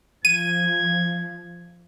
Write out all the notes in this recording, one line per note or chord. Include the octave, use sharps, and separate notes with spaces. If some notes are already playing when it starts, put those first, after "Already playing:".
F3 G#6 D#7